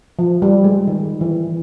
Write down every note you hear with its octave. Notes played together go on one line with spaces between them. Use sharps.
F3
G3
G#3
D#3
E3